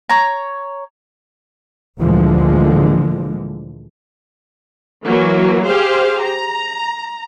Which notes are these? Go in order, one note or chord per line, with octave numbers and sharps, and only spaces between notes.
C#5 A#5
D2 A#2 D3 E3 F3 G#3
E3 F#3 A#3
G4 G#4 C5 F5
A#5